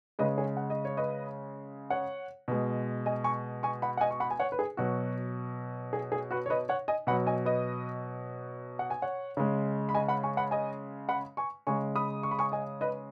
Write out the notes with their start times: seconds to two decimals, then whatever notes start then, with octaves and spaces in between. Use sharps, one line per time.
0.19 C#3 G#3 B4 D#5
0.37 G#4 C#5
0.57 F#5
0.70 D#5
0.85 C#5
0.97 B4 D#5
1.90 C#5 F#5
2.48 B2 G#3
3.06 D#5 G#5
3.24 G#5 C#6
3.63 G#5 C#6
3.82 F#5 B5
3.97 F#5
4.01 D#5 G#5
4.11 C#6
4.20 F#5 B5
4.31 G#5
4.40 C#5 F#5
4.52 B4
4.59 G#4
4.77 B2 F#3 F#4
5.93 G#4
6.12 G#4
6.31 F#4 B4
6.46 C#5
6.50 B4 D#5
6.69 C#5 F#5
6.88 D#5 G#5
7.07 B2 F#3 F#5 B5
7.27 D#5 G#5
7.45 B4 D#5
8.79 F#5
8.90 G#5
9.02 C#5 F#5
9.37 C#3 G#3
9.89 B5
9.95 D#5 G#5
10.08 F#5 B5
10.23 G#5 C#6
10.37 F#5 B5
10.51 D#5 G#5
11.09 F#5 B5
11.37 G#5 C#6
11.67 C#3 G#3 G#5 C#6
11.96 B5 D#6
12.23 C#6
12.31 B5
12.39 G#5 C#6
12.52 D#5 G#5
12.81 B4 D#5